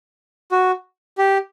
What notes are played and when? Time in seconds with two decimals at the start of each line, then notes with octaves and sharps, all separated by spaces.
0.52 F#4
1.18 G4